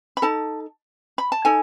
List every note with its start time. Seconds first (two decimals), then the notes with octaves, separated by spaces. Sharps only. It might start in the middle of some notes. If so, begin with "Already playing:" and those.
0.17 B5
0.22 D#4 A4 A5
1.18 B5
1.32 A5
1.45 D#4 A4 G#5